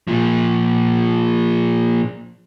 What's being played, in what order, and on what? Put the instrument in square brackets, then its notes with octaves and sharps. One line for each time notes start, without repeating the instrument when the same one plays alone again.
[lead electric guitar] A#2 F3